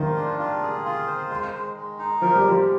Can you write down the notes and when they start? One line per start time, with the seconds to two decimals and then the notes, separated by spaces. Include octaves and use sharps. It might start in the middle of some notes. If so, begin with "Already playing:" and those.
Already playing: D#3 F4 C5
0.16 D4
0.39 F4
0.63 G#4
0.85 F4
1.07 C5
1.30 G#3
1.53 G#3
1.76 G#3
1.99 D#4
2.22 F3 A#4
2.35 G3
2.44 F3 G#3